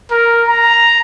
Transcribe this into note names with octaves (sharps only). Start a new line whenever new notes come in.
A#4
A#5